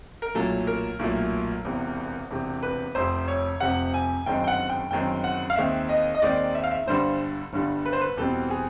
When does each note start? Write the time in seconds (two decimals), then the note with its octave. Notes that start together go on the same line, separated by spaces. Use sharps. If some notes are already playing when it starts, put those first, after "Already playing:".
0.22 A#4
0.34 B1 A#2 F#3 A3 A4
0.67 A#4
0.99 B1 A#2 F#3 A3
1.65 E1 E2 C3
2.30 E1 E2 C3
2.63 B4
2.95 F1 F2 C3 C5
3.28 C#5
3.60 F1 F2 C3 F#5
3.94 G#5
4.26 G1 F#2 D#3 G#3 C4 G5
4.44 G5
4.48 F#5
4.69 G5
4.91 G1 F#2 D#3 G#3 C4 G5
5.24 F#5
5.50 F5
5.56 D#2 D#3 G#3 C4 E5
5.89 D#5
6.15 D#5
6.22 D#2 D#3 G#3 C4 D5
6.55 E5
6.64 F5
6.71 E5
6.86 G1 G2 D3 G3 C5
7.53 G1 G2 D3 G3
7.86 B4
7.93 C5
8.01 B4
8.17 E2 B2 G3 C4 A4
8.50 G#4